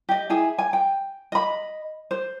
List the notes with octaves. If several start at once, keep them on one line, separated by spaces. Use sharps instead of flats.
G4 D#5
E4 G#4 G#5
G#5
G5
D#5 B5
C5